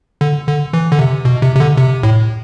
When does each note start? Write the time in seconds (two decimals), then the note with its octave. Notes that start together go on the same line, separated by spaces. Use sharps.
0.21 D3
0.47 D3
0.73 E3
0.92 D3
0.99 C3
1.25 B2
1.42 C3
1.55 C3
1.60 D3
1.78 C3
2.03 A2